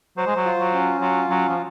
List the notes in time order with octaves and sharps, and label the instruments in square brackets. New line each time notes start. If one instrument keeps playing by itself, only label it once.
[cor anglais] F#3 [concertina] C5
[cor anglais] G#3
F#3
[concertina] F4
[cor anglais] F#3
[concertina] C#4
[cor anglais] F#3 [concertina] F4
[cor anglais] F#3 [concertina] C#4
[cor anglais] F3